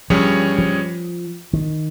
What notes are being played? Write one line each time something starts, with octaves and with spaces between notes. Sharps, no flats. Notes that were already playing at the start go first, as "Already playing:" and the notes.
G2 F3 G3 C#4 G#4 C#5
F3
D#3